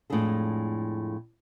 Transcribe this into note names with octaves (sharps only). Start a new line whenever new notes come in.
F2 A2 G#3 D4 G#4 A4